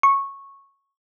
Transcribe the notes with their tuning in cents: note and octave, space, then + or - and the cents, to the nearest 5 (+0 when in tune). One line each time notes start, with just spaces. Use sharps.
C#6 -10